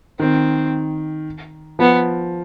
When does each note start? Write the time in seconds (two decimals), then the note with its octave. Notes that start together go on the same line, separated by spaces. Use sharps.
0.19 D#3 C4
1.79 F3 B3